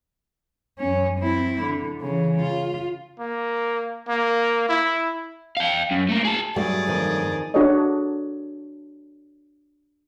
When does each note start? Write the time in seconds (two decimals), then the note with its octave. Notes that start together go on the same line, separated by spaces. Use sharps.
0.79 F#2 C#4
1.19 C4 E4
1.62 D3
2.02 C#3 E3
2.42 F4
3.19 A#3
4.08 A#3
4.69 E4
5.57 F5 G5
5.91 F#2
6.09 A3 A#3
6.24 G#4 A5
6.56 G2 F#3 A3 G#4 D5
6.87 F2 D#3
7.54 D4 F#4 G#4 A4 C#5 D#5